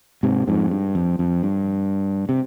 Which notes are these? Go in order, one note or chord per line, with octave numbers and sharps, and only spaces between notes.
G#2 C3
F2 G#2
G2
F2
F2
G2
C3